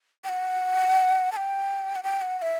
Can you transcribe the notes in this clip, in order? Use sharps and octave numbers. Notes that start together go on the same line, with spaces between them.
G5
F#5
A5
G5
F#5
G5
F#5
F#5
E5